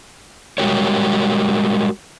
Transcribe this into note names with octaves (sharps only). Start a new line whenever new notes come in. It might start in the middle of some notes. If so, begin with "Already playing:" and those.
G3 G#3 F#4 G4 A#4 C#5